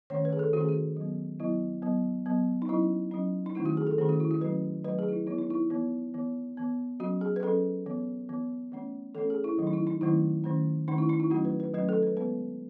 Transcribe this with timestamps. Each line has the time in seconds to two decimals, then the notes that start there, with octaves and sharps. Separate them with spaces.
0.10 D#3 A3 C#4 C#5
0.25 B4
0.33 G#4
0.39 A4
0.53 D#3 A3 C#4 F#4
0.60 G#4
0.69 F#4
0.97 F#3 B3
1.40 F#3 B3 E4
1.82 F#3 B3
2.26 F#3 B3
2.62 D#4
2.69 F#3 C#4 E4
3.11 F#3 C#4
3.46 D#4
3.55 D#3 A3 C#4 E4
3.66 F#4
3.77 G#4
3.87 A4
3.98 D#3 A3 C#4 G#4
4.09 F#4
4.20 E4
4.31 F#4
4.41 F#3 A3 C#4 B4
4.84 F#3 A3 C#4 B4
4.99 G#4
5.09 E4
5.12 D#4
5.27 E3 B3 E4
5.39 D#4
5.50 E4
5.70 E3 B3
6.14 E3 B3
6.57 E3 B3
7.00 F#3 C#4 F#4
7.21 G#4
7.36 B4
7.43 F#3 C#4 A4
7.86 E3 B3
8.29 E3 B3
8.72 E3 A3 C#4
9.15 E3 A3 C#4 A4
9.30 G#4
9.44 E4
9.58 D#3 F#3 A3 C#4
9.67 D#4
9.73 E4
9.87 D#4
10.01 D#3 F#3 A3 C#4 E4
10.44 D#3 A3 C#4
10.88 D#3 A3 C#4 D#4
10.98 E4
11.09 D#4
11.20 E4
11.30 F#3 A3 C#4 F#4
11.45 B4
11.60 B4
11.74 F#3 A3 C#4 B4
11.89 A4
12.03 B4
12.17 E3 G#3 B3 B4